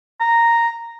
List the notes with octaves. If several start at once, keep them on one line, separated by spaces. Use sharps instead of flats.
A#5